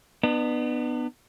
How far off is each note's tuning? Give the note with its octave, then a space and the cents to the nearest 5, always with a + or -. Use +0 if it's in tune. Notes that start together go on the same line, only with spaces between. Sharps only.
B3 +0 D4 +45